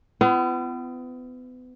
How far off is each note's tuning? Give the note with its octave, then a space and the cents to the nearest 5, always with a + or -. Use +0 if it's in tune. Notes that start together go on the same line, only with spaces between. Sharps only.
B3 +35 F4 -45